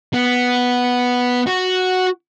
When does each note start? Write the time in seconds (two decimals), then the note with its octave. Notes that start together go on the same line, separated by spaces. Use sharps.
0.14 B3
1.47 F#4